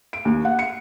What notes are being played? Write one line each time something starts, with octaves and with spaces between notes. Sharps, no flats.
D7
D#2
F#5
C#7